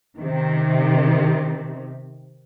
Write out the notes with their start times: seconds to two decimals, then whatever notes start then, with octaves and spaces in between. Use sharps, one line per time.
0.18 C3 D#3